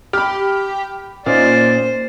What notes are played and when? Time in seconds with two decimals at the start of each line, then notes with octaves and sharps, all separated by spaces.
0.13 G4 B5 F6
1.26 A#2 C#4 D#4 F4 C5 D5